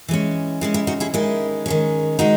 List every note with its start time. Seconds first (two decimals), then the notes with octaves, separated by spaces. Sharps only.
0.08 E3 G#3 C#4
0.61 E3 G#3 C#4
0.74 E4
0.87 D#4 F#4
1.00 E4 G#4
1.14 D#3 G#3 C#4 E4
1.66 D#3 G#3 C#4
2.19 D#3 G#3 D#4 F#4